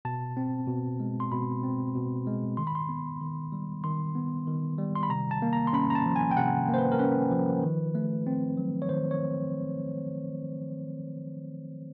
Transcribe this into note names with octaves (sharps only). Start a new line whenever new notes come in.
B2 A5
C4
B2
G#3
C6
B2 B5
C4
B2
G#3
D#3 C6
B5
C6
B3
D#3
G3
D#3 C6
B3
D#3
G3
C6
B5
C3 A#5
A5
A#3
A#5
C6
C#4 B5
A#5
A5
F3
G#5
G5
C3 F#5
A#3 C5
B4
A#4
C#4 B4
F3
D#3
A3
C4
F#3
C#5
D#3 C5
C#5